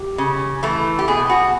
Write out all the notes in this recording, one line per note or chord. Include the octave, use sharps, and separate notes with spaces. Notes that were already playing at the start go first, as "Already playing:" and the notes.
Already playing: G4
C#3
E3 A3
G4
B2 G#4
F#4